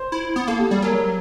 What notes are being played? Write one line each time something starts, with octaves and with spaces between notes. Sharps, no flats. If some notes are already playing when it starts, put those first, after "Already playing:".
Already playing: C5
E4
B3
A#3 A4
G4
G3 G#4
F#3 A#4